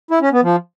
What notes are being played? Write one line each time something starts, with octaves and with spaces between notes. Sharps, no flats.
E4
C#4
B3
F3